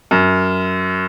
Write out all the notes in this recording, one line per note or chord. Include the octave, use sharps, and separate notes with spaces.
F#2